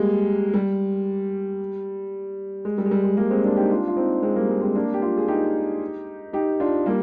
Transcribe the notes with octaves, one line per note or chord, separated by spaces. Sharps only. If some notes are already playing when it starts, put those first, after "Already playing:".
Already playing: G3 G#3 A#3
G3
G#3
G3
G#3
G3
G#3
G3 A#3
G#3 C4
A#3 D4
D#4 G4
D4 F4
F4
C4 D#4
G#3 C4
G3 A#3
G#3
G#3 C4
A#3 D4
G4
D4 F4
G#4
D#4 G4
D#4 G4
D4 F4
G3 A#3